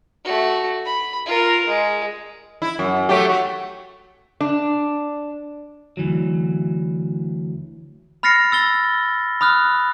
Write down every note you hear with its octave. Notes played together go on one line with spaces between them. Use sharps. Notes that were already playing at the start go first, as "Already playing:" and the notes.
A3 F#4
B5
F4 A#4
G#3
E4
F#2
F#3 A3 G4
F#4
D4
D2 E3 F#3
B5 F6 A6 A#6 C7 C#7
E6 A6 G7
B5 D#6 F6 F#6